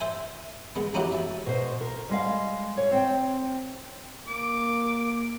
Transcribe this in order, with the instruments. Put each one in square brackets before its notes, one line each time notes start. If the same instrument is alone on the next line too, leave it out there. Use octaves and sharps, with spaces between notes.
[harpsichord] C5 E5 G#5
G#3 B3
F3 C#4 D#4 E4 F#4 G4
E5 A5
[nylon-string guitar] B2 C5
A#4
G3 G#3 D#5 F5
C#5
C4 G5
[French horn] A#3 [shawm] D6